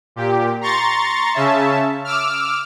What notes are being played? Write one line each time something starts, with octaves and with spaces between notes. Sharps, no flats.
A#2 G4
A#5 C6 C#6 A6
C#3 C#4 E5 A5
D6 E6 F6